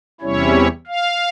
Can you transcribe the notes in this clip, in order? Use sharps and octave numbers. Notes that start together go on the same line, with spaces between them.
E2 C3 G3 C#4 E4 C#5
F5